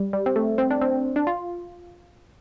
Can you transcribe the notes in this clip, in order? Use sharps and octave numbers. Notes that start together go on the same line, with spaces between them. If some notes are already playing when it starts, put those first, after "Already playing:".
Already playing: G3
G3
C4
A3
C4
D4
C4
D4
F4